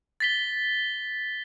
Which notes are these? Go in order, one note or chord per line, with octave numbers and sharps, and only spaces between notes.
A6 B6 G7